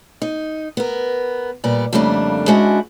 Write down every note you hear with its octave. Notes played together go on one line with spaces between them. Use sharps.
D#4
B3 A#4
A#2 G3 B3 D5
F2 C#3 G3 A3 A#3 D4
G#3 C#4 D4 E4 F#4 C5